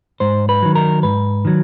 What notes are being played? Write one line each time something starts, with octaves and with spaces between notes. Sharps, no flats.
G#2 C5
B4
D#3 F#3
A#4
G#2 B4
D#3 F#3